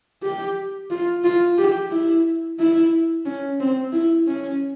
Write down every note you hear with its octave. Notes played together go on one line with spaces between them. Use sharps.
G4
F4
F4
G4
E4
E4
C#4
C4
E4
C#4